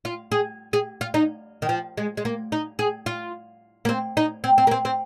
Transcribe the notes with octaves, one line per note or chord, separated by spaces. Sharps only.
F4
G#4
G#4
F4
D#4
D#3
F3
G#3
G#3
A#3
D#4
G#4
F4
A#3
C4
D#4
C4
C4
A#3
C4
C4